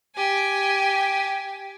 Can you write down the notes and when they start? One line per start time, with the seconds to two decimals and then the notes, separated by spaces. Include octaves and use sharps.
0.16 G4 G#5